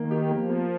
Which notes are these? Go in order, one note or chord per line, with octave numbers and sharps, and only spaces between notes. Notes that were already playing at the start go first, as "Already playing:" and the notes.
Already playing: D#3 A#3
G4
F3 A#3
A#3